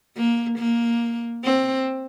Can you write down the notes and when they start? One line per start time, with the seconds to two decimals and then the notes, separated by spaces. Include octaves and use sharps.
0.17 A#3
0.59 A#3
1.44 C4